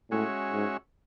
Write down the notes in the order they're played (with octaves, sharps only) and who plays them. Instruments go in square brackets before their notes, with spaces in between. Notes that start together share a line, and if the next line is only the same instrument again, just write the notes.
[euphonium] A2 [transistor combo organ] G#3 C#4 F#4 C#5 E5
[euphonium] G#2